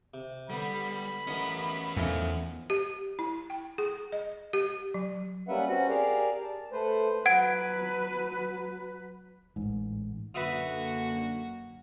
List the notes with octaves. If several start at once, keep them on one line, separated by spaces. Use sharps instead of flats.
C3
D3 G3 B3 B5
A1 B3 C#4 A#4 D#5
E2 F3 A3 D#4
G4
E4
G5
G#4
D#5
G4
F#3
G3 A#3 C#4 B4 E5 F#5
C4 C#4 F#4 F#5
G4 G#4 A#4 D5 F5
A5
A3 B4 C5
F#3 B4 F#5 G#6 D7
A1 G#2
F#2 D3 A#3 F#4 B4 E5 D#6